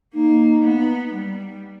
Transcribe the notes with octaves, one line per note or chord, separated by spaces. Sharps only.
A#3 D#4
B3
G3